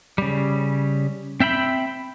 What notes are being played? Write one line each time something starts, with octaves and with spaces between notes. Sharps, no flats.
C#3 G3
C4 E5 G5 B5